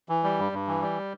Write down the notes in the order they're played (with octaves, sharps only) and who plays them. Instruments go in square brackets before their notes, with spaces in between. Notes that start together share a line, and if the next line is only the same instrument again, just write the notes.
[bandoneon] E3
G3
G2
G2
E3
G3